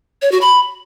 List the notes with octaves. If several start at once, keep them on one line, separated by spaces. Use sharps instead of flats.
C#5
F#4
B5